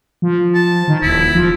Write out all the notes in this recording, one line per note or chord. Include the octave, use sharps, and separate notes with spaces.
F3
A5
D#3
D#1 E4
F3